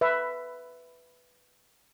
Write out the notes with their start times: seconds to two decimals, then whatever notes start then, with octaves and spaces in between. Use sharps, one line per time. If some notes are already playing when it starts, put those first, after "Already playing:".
0.01 B4 E5